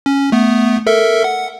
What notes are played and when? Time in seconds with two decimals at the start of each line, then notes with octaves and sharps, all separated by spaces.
0.06 C#4
0.32 A3 B3
0.87 A4 A#4 E5
1.24 F#5